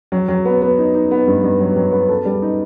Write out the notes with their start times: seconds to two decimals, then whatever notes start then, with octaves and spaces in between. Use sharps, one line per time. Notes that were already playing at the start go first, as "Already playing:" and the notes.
0.12 F#3
0.28 F#3
0.45 B3
0.62 B3
0.78 D#4
0.94 D#4
1.11 B3
1.27 G2
1.43 G2
1.60 F#3
1.77 F#3
1.92 B3
2.09 A4
2.25 G3
2.42 D#4